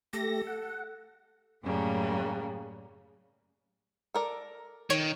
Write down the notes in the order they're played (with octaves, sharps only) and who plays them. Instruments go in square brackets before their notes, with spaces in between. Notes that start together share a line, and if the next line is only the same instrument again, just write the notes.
[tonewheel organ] A3 G4 A#6 [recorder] A4
[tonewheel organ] F#5
[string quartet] F#2 A2 C#3 G3 A#3
[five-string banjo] A4 A#4 D5
[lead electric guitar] D#3 [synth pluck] C#5